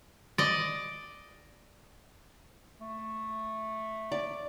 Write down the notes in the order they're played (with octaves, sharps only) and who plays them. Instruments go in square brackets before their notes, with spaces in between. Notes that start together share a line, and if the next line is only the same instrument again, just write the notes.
[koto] D5 D#5
[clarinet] A3
[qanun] D5